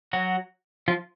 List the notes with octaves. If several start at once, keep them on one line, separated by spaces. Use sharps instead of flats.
F#3 F#4
F3 F4